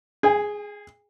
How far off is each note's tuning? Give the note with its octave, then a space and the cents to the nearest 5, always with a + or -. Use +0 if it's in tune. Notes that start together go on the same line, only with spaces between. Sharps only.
G#4 +0 G#5 -45